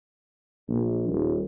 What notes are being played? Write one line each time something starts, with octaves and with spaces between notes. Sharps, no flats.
A#1
D#1